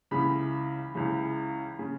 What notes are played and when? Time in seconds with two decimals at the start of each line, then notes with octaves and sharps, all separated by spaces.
0.11 C#2 C#3 E3 B5
0.94 C#2 C#3 E3
1.79 C#3